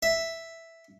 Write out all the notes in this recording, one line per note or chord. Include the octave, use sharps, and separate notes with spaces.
E5